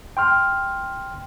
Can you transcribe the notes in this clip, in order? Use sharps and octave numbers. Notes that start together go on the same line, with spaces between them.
G5 C6 F6